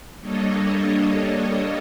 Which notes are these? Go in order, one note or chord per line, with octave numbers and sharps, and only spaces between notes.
G3 A#3 D4 A4 C#5 D#5